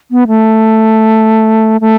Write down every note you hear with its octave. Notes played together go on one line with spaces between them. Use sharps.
B3
A3
A3